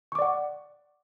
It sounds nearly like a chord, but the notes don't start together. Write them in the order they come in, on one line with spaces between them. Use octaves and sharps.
C#6 D6 D5 F#5